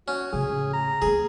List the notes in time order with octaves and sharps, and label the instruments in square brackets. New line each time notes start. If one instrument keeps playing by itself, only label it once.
[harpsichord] C#4 [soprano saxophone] F#4
[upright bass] A2 C#3 [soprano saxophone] G#4
[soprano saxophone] A#5
[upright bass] A3 A#3 [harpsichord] G#4